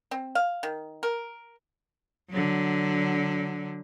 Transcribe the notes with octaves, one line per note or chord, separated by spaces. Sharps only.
C4
F5
D#3
A#4
D3 F#3